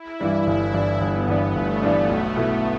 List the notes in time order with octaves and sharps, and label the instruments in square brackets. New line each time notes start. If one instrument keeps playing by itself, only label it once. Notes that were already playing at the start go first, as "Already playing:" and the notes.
Already playing: [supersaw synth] E4
[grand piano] G2 E3 G3 D4
G1
G2 E3 G3 D4
[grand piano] G1 [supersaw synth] B3
[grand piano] G2 E3 G3 D4
[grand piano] G1 [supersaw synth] A3
[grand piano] G2 E3 G3 D4
B1
B2 A3 E4